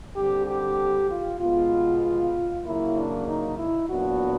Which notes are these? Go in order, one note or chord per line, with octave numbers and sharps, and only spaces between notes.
D3 G3 C4 G4
G4
F4
B2 G#3 B3 F4
C#3 F#3 A#3 E4
D4
D#4
E4
A#2 F#3 B3 D4 F#4